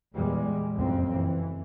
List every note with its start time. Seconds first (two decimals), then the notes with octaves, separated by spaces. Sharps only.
0.14 E2 A#2 G3 G#3
0.76 F#1 F2 C4
1.14 E3